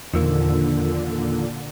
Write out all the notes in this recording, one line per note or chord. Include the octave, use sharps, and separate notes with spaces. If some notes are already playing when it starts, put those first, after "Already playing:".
E2 A#2 D3 D#3 F3 A#3 E6